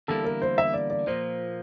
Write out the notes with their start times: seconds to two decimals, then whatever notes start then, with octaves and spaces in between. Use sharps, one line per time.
0.08 E2 D3 G3 A#3 E4 A4
0.25 A#4
0.42 C5
0.58 E5
0.74 D5
0.90 D5
1.07 A#2 F3 A#3 C5